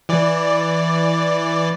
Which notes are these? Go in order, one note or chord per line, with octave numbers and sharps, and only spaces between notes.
E3 D5